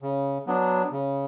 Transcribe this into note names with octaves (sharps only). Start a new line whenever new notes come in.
C#3
F#3 B3 D4
C#3